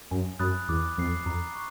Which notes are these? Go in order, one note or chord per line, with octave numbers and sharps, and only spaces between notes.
F#2 G#5
F#2 B5 D#6 F#6 A6
E2 D6
F2 F#6 A6 C7
F2 A#5
C#6 F#6